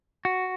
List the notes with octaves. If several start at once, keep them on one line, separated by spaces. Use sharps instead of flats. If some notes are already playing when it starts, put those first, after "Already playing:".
F#4